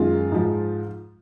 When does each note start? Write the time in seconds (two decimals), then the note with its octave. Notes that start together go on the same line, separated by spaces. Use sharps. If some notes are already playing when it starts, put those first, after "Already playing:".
Already playing: F#2 D#3 G#3 F4
0.32 G#2 F3 G#3